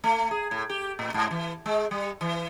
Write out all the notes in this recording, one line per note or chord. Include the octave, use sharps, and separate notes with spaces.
A3
G#4
A2
G4
A2
G#2
E3
G#3
G3
E3